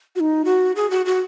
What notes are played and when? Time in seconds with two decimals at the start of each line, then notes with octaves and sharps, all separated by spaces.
0.16 F#4
0.20 D#4
0.45 F#4
0.76 G#4
0.90 F#4
1.06 F#4